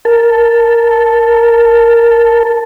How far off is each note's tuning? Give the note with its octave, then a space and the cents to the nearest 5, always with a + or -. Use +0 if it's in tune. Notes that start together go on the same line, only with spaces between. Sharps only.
A#4 +0 A5 +0